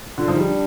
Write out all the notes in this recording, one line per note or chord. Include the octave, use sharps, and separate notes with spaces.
D3 F4
F3
G3 D#4
D4